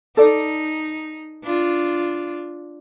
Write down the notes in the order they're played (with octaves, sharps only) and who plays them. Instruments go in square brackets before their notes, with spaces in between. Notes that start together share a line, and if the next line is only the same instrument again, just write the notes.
[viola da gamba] D#4 [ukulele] A4 D5
[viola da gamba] D4 F4